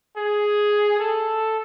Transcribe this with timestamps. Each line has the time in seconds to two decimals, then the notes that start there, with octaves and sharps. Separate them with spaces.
0.17 G#4
1.00 A4